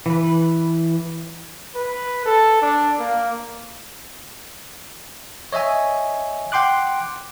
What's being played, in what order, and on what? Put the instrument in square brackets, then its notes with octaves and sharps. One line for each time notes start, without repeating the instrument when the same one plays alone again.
[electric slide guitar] E3 B4
[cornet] B4
A4
D4
A#3
[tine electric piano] C#5 D#5 E5 G#5
F#5 G5 C6 D6 F#6